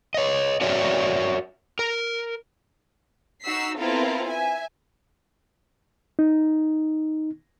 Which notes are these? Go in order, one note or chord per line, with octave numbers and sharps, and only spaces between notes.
C#5 D#5
F#4 A#4 C#5 D5 E5
A#4
D#4 F#4 E6 B6 C7
B3 C4 E4 F4 A4 A#4
E5 G#5
D#4